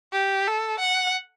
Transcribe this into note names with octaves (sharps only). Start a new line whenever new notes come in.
G4
A4
F#5